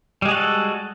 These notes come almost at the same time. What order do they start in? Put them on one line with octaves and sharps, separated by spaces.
G3 G#3 G#4 F#4 A4